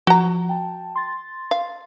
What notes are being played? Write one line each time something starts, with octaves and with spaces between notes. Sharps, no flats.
F3 F#4 A#5
G5 A5
C6 A6
F5